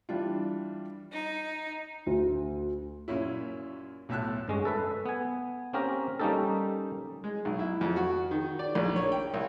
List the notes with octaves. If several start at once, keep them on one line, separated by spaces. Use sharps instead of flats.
E3 G3 D4 F4
D#4
D2
F#2 A#2 C#4 E4
B1 A2 E5 A5 F#6
G2 G#3 C#4
A4 B4 E5
B3 G#5
A#3 C4 C#4 G4 A#4
G3 A#3 C#4 D#4 G4 A4
G#3
B1
E4
F2
F#4
D#3
D5
A#1
C#5
G5
C2